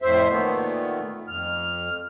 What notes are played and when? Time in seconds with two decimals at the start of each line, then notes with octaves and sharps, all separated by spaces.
0.02 F2 A2 C5 E5
0.29 A#2 D#3 A3 B3
1.28 F2 F6